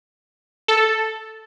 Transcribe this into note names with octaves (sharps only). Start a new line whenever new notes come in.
A4